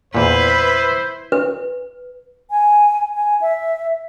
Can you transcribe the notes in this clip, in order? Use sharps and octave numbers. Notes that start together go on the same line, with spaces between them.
E2 A#2 E4 B4 C5
B4
G#5
G#5
E5